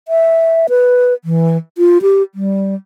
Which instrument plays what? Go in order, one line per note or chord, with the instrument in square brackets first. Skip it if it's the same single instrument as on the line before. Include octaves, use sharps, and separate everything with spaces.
[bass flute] E5
B4
E3
F4
G4
G3